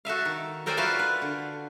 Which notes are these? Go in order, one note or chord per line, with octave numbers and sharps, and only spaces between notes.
F#4 A4 E5 F5
D#3
A4 A#4 C5 D5 G5 G#5
F4 F#4 B4 E5 F5
B4
D3